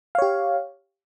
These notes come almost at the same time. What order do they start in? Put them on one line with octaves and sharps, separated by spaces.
F5 C#5 G4